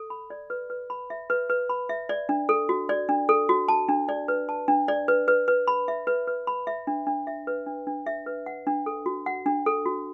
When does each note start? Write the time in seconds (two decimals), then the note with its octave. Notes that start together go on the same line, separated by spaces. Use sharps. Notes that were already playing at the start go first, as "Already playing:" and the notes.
Already playing: A4
0.10 B5
0.30 D5
0.50 B4
0.70 B4
0.90 B5
1.10 E5
1.30 B4
1.50 B4
1.69 B5
1.89 E5
2.09 D5
2.29 D4
2.49 A4
2.69 F#4
2.89 D5
3.09 D4
3.29 A4
3.49 F#4
3.68 A5
3.89 D4
4.09 D5
4.28 B4
4.49 A5
4.68 D4
4.88 D5
5.08 B4
5.28 B4
5.48 B4
5.67 B5
5.88 E5
6.07 B4
6.28 B4
6.47 B5
6.67 E5
6.87 D4
7.07 D4
7.27 E5
7.47 B4
7.66 D4
7.87 D4
8.06 E5
8.26 B4
8.46 F#5
8.67 D4
8.86 A4
9.06 F#4
9.26 F#5
9.46 D4
9.66 A4
9.86 F#4